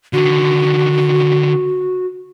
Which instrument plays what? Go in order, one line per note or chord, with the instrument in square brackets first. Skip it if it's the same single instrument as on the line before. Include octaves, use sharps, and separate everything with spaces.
[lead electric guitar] D3 D#3 [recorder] F#4